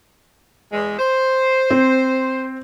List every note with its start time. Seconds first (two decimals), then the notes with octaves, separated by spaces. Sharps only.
0.72 E2 G#3
0.99 C5
1.70 C4